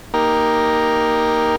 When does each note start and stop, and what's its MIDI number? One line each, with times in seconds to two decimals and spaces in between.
0.14 1.56 58
0.14 1.56 63
0.14 1.56 67
0.14 1.56 70